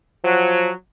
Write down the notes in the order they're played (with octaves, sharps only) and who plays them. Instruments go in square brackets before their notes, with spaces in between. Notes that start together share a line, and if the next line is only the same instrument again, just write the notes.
[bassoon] F3 [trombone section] F#3